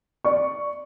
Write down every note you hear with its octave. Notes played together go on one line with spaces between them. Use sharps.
D5 C#6